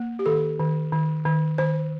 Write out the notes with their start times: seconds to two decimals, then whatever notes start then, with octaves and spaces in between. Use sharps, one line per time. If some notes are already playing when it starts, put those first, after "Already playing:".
Already playing: A#3
0.19 G4
0.26 D#3 A4
0.59 D#3
0.92 D#3
1.26 D#3
1.58 D#3 C5